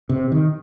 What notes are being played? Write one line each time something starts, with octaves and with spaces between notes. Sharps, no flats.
C3
D#3